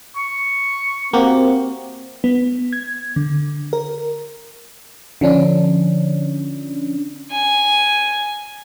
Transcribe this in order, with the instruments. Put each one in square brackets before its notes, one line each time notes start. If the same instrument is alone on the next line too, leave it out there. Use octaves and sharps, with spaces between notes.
[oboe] C#6
[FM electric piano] A#3 F#4 G4 [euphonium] C4
[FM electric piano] B3
G#6
D3
A#4
D3 F3 C#4 D4
[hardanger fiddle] G#5